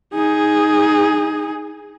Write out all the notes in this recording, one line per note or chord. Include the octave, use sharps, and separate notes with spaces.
D#4 G#4